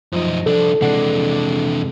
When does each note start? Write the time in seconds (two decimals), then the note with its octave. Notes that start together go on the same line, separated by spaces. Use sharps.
0.13 F#2 F3 D#4
0.46 C2 D4 A4
0.82 F2 C3 E3 G#3 D4 F#5